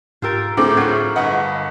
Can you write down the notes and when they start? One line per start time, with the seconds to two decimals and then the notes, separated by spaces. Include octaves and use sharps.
0.22 G#2 F4 G4 A#4 E6 A6
0.57 D2 A2 C4 D4 G#4 A4 D6
0.77 F#3 F4 A#4 C#6
1.16 G1 A#4 B4 D#5 F#5